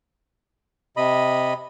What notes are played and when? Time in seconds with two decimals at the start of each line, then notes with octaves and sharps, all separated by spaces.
0.97 C3 D#5 B5